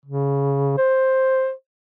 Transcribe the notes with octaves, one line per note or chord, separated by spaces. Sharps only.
C#3
C5